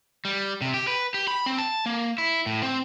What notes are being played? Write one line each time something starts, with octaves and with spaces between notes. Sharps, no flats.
G3
C3
G4
B4
G4
B5
C4
A5
A#3
E4
A2
C4